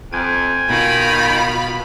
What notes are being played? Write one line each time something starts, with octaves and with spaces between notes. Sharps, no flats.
F2 G5 G#5 G#6
B2 D#3 F4 B5